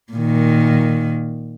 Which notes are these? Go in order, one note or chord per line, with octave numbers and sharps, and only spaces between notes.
A#2 D#3